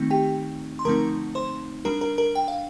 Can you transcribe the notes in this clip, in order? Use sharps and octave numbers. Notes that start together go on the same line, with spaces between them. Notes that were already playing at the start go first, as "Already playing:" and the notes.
Already playing: D#3 A3 C4 D#4
G4 G5
C6
D3 F3 A3 C4 D#4 A#4 A#5
C5 C6
G3 D4 A#4 A#5
A#4 A#5
A#4 A#5
G5
F5